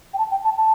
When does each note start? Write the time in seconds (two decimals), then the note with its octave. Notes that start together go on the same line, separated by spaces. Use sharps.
0.14 G5
0.18 A5
0.31 G5
0.45 A5
0.57 A5